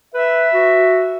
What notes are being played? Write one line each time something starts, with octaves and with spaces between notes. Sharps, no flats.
B4 E5
F#4